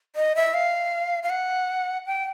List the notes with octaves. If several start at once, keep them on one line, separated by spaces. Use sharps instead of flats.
D#5
E5
F5
F5
F#5
G5